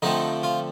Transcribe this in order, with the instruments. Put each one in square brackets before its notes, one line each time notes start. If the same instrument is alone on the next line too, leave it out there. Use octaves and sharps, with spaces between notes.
[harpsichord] D3 F3 A3 C4 D#4
F4